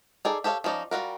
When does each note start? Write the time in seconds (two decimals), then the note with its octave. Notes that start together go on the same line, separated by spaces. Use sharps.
0.25 D#4 G#4 A4 D5
0.44 G4 A4 C#5 D5 F5
0.64 F3 C#4 D#4 D5
0.91 G3 F4 F#4 A#4